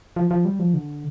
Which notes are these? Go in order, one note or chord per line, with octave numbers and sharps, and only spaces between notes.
F3
F3
G3
F3
D3